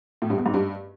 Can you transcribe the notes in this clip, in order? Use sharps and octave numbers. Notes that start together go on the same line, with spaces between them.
A2
G2
E2
G#2
G2